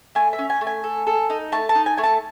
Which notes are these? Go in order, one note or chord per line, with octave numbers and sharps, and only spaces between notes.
A3 G#5
E5
C#4
G#5
A3
G#5
A4
A4
D#4
A3 A5
A5
D#4
G#5
A3 G#5
A5